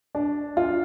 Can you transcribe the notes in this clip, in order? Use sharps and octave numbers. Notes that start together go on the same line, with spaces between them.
D4
F4